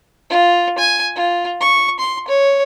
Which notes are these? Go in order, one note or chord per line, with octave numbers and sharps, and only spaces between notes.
F4
G#5
F4
C#6
C6
C#5